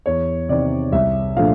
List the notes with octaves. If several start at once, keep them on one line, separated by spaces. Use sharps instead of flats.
E2 C#5
C3 D#3 D5
C2 E5
A#2 F3 A3 D4 F5